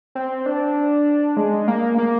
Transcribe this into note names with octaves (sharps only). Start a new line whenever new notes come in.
C4
D4
G#3
A#3
A#3